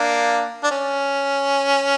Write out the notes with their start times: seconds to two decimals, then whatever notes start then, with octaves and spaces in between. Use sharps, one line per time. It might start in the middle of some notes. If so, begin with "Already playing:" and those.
Already playing: A#3 D4
0.64 D4
0.71 C#4